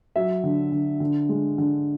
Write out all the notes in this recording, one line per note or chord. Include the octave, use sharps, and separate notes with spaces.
F#3 E5
D3
D3
D3
G#3
D3